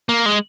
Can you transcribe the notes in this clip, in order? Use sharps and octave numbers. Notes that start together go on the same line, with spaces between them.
A#3
G#3